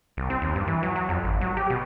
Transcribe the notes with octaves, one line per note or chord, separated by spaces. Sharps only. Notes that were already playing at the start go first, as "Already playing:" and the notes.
C2
C4
D#2
G2
E3
F#3
F#3
F2
G#1
F#3
G4
B2